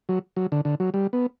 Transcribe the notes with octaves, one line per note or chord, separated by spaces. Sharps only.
F#3
F#3
D3
D3
F#3
G3
B3